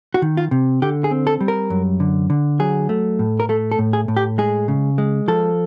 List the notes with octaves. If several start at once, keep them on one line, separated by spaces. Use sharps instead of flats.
F#4
D#3
F4
C3
D3 G4
G#4
C4
A4
G3
A#4
F#2
D3
D3
F#3 G#4
A3
A2
A#4
A3 A4
A4
A2
G#4
A2
G4
G#3 G#4
C#3
G#3
F3 A4